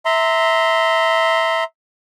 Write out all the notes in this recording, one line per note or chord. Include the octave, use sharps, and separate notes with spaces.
E5 A#5 C6